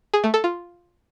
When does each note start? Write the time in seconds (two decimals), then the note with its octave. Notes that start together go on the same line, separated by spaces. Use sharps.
0.14 G#4
0.24 A3
0.34 A4
0.44 F4